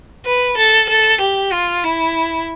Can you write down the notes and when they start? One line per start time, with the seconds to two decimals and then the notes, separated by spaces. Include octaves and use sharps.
0.25 B4
0.57 A4
0.89 A4
1.20 G4
1.52 F4
1.84 E4